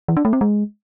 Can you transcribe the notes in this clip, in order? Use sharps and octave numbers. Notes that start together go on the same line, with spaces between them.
E3
D4
A3
C4
G#3